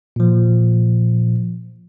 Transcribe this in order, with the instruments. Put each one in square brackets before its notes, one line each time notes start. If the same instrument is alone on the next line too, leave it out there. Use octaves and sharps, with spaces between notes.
[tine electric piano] A#2 F3